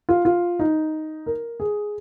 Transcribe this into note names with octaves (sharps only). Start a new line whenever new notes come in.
F4
F4
D#4
A#4
G#4